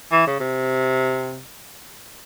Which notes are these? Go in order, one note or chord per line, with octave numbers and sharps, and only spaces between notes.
E3
C#3
C3